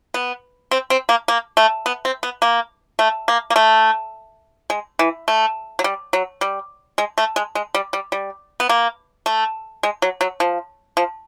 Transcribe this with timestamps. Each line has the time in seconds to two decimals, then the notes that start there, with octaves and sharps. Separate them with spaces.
0.14 B3
0.71 C4
0.90 C4
1.09 A#3
1.28 A#3
1.57 A3
1.86 B3
2.05 C4
2.23 B3
2.42 A#3
2.99 A3
3.28 A#3
3.50 A#3
3.56 A3
4.70 G#3
4.99 E3
5.28 A3
5.79 F#3
5.84 G3
6.13 F#3
6.41 G3
6.98 G#3
7.18 A3
7.36 G#3
7.55 G#3
7.74 G3
7.93 G3
8.12 G3
8.60 B3
8.69 A#3
9.26 A3
9.83 G#3
10.02 F#3
10.21 F#3
10.40 F3
10.97 F3